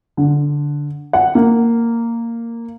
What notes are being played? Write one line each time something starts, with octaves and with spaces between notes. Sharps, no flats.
D3
F#5
A#3